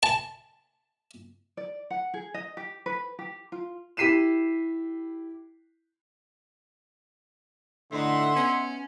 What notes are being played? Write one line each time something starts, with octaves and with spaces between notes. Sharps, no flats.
A5
D5
F#5
G#4
D#5
G4
B4
G4
F4
E4 G4 B6 C7 D#7 E7
A2 D3 D#4 E5 F#5 C6
B3 C#4